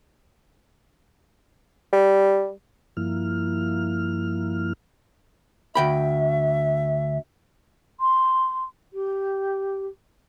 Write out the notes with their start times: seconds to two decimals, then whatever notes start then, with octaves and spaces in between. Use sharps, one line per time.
1.93 G3
2.97 G2 F3 A#3 E4 F6
5.75 D2 E5 G5 B5
7.99 C6
8.93 G4